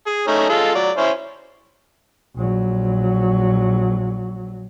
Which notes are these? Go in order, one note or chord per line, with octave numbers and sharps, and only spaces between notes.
G#4
A3 C#4 D#4
G#3 F4 A4
F#3 D5
C#4 E4 C5
A#1 F#3